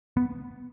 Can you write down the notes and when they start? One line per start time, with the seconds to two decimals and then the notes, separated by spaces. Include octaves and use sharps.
0.17 B3